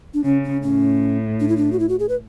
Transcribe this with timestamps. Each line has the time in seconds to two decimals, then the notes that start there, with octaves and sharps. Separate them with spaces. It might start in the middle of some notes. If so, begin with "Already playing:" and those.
0.14 D4
0.24 C#3 C#4
0.44 C#4
0.63 A2 C#4
1.40 D4
1.49 E4
1.57 D4
1.72 F#4
1.80 E4
1.89 F#4
1.99 G#4
2.09 B4